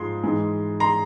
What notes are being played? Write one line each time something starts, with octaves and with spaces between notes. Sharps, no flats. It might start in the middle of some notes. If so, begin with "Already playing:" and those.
Already playing: G#2 F3 G#3 C6
G#2 E3 G#3
A#5 C6